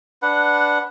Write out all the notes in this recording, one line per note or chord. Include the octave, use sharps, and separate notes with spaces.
D4 B4 F#5